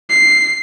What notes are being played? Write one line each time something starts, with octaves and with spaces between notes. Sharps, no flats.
C7